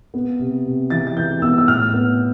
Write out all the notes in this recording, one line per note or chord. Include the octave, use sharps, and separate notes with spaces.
B3
C3
C3
E3 A6
A6
E3 G6
B3 E6
E6
A2 F6
B3